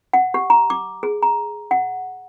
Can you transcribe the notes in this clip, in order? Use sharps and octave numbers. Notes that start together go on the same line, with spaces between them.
F#5
G4
A#5
D6
G#4
A#5
F#5